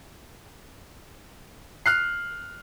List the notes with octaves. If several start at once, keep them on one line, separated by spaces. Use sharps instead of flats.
F6 F#6 C7